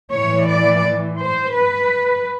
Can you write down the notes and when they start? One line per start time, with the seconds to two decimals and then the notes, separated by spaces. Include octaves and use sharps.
0.12 A2 E3 C#5
0.48 D5
1.19 C5
1.53 B4